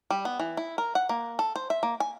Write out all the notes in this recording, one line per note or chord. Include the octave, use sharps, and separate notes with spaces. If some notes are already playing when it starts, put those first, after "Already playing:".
G3
B3
E3
E4
A#4
F#5
A#3
A4
C5
E5
A#3
G#5